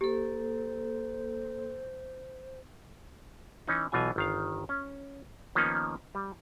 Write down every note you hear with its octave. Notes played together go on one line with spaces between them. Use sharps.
A#3 G4 A4 C5
E3 C#4 D#4
B1 B2 E3 F4 G#5
G1 D#3 F5
C#4
D#3 F3 A#3 B3 C#4 D#4
G3